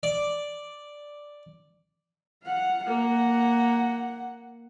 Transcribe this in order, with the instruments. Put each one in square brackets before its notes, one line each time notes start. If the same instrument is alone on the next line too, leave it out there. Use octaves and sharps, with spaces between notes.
[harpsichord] D5
[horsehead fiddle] F5 F#5
[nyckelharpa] A#3 [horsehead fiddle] F#5